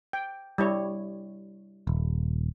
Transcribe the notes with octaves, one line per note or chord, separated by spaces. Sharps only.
G5
G3 E4 C#5
D#1